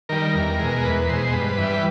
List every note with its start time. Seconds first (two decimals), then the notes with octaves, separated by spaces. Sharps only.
0.09 D#3 G3 A#4
0.35 E2
0.59 B2 G#3
0.84 E2 B4
1.08 B2 G#3 C5
1.33 G2 B4
1.58 E3 G3